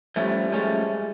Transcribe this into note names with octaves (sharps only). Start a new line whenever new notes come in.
F3 G3 A3 C#4
F3 G#3 A3 C#4